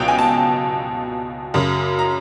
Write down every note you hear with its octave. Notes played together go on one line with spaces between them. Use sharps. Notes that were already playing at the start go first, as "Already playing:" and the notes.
Already playing: C#2 B2 F#3 G5
G#5
A5
F#2 C#3 F#3
A#5